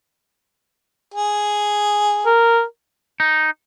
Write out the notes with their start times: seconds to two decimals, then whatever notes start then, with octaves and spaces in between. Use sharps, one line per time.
1.14 G#4
2.26 A#4
3.20 D#4